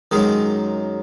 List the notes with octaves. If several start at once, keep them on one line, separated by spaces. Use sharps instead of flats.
F#2 D#3 G#3